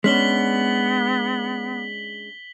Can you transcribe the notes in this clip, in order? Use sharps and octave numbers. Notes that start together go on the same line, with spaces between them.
G#3 B3 C#4 D4 B6 F#7 G7